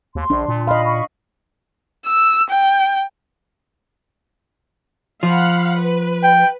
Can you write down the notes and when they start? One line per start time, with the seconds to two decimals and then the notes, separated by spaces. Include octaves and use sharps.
0.15 D#2 C6
0.30 A#1 D4
0.48 A#2
0.68 D#5 F5 B5 C6
0.84 B5 C#6
2.07 E6
2.50 G5
5.23 F3 F5 F#5 B5
5.78 B4
6.23 G5